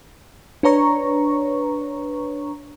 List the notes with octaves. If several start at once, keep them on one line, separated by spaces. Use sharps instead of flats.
D4 B4 C#5 A#5 C#6